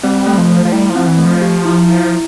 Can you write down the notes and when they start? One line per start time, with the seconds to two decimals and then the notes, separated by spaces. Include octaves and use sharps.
0.03 G3 C4
0.26 A3
0.38 F3
0.49 A3
0.65 F3
0.72 G3 E4
0.90 F3
0.95 C4
1.07 E3
1.18 A3
1.25 F3
1.42 G4
1.65 E4
1.89 E4